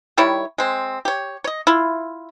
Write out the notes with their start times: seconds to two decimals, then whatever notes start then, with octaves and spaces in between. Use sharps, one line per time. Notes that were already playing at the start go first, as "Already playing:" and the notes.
0.17 D#3 G3 E4 C#5
0.58 G#3 C4
1.05 G4 C#5
1.44 C#5 D#5
1.67 E4 F4